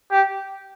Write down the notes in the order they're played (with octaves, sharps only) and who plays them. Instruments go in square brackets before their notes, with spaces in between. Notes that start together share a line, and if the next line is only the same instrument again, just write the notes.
[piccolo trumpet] G4